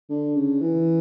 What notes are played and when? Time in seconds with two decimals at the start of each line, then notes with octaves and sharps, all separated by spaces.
0.10 D3
0.36 C#3
0.62 E3